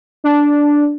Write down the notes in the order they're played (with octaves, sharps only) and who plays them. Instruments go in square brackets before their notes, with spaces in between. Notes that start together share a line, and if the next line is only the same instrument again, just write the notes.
[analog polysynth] D4